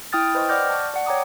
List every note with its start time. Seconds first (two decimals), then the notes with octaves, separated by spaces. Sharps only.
0.13 E4 G5 D#6 F6 A6
0.35 B4 C5 D#5 G5 C#6 G6
0.49 D5 F#5 D6 F6 G6 A#6
0.70 A5 C#6
0.94 D5 F#5
1.06 C#5 G5 A#5 D6 D#6